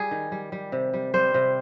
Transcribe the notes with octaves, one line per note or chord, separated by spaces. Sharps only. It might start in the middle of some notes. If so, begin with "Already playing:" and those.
Already playing: G3 G#4
D#3
G3
G3
C3
G3
G3 C5
C3